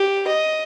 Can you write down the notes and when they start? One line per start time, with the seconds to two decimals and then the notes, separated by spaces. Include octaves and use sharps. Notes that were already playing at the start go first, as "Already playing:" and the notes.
Already playing: G4
0.27 D#5